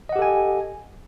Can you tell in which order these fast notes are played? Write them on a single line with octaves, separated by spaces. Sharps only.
D#5 F#5 G4 A4 G#5